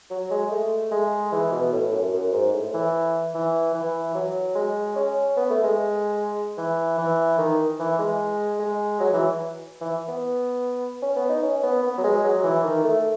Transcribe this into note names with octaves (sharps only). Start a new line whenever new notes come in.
F#3
G#3
A3
G#3
E3
B2
A2
F#2
F#2
G#2
A2
E3
E3
E3
F#3
G#3
C#4
B3
A3
G#3
E3
E3
D#3
E3
G#3
G#3
F#3
E3
E3
B3
C#4
B3
D#4
C#4
B3
B3
F#3
G#3
F#3
E3
D#3
A3